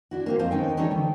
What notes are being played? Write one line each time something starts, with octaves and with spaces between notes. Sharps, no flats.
D4 E4 F#4
A#3 C4 G4
F2 G#3 C5 F5 G#5 A#5
D#2 B3 C#4 D#4 G5
E3 G3 C#4 D#4 A4 C#5
D2 G5